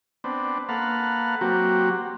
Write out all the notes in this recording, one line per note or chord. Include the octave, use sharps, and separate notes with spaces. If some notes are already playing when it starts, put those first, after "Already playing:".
B3 C4 D4
A#3 A4 B4 F5 F#5
F#3 A#3 C4 F#4 G4